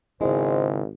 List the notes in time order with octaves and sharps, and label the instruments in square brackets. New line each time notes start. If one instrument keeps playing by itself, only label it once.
[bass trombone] G#1 [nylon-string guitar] C#3 E4 [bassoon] G#3 [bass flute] C5